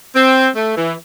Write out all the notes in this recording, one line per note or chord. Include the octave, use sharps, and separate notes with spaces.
C4
A3
E3